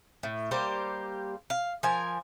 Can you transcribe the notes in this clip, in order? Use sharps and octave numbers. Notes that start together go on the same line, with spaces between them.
A2
G3 A#3 G4 C5
F5
F3 A#4 G#5